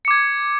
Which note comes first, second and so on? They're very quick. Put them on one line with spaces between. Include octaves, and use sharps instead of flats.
C#7 D6 G#6